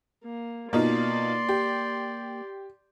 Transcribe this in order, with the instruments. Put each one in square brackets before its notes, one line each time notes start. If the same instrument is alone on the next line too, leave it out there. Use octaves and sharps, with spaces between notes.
[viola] A#3
[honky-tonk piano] B2 D#4 F4 [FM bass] A#3 [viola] D5 C6
[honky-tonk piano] G4